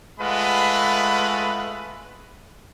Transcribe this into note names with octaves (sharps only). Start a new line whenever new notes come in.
G#3 A3 F4 B4 F#5 B5